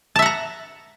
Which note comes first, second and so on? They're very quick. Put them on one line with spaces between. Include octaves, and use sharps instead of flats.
A5 E5 F#5 A#5